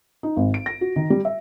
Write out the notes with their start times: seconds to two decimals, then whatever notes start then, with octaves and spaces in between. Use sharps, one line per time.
0.23 D#4
0.37 G#1
0.54 D7
0.66 A#6
0.81 F#4
0.96 D#3
1.10 G3
1.25 E5